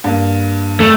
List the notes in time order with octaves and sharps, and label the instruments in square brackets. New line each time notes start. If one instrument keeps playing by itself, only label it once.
[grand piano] G2 A#3
[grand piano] F1 [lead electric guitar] A3